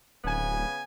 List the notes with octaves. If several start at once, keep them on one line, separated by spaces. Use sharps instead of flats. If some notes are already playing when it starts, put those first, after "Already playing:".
D1 C#3 B3 G#5